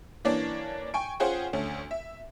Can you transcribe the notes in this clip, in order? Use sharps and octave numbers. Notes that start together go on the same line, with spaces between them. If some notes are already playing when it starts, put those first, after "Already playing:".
E3 A#3 C#4 D4 C#5 D5
G5 G#5 C#6 D7
C#4 F4 G#4 C5 F#5 G5
D2 A3 C#4
E5